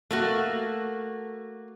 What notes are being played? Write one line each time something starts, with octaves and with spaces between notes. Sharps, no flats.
A3 A#3 F#4